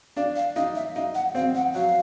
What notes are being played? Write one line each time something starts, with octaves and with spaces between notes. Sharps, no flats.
D4 F5
F5
D#4 F5
E5
D#4 F5
F#5
C4 F5
F#5
F#3 F5